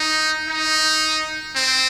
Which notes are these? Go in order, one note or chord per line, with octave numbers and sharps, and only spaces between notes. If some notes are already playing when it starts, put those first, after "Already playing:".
Already playing: D#4
D#4
C4